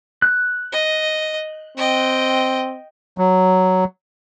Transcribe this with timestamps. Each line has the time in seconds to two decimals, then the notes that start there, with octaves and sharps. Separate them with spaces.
0.22 F#6
0.72 D#5
1.77 C4 D#5 G5
3.18 F#3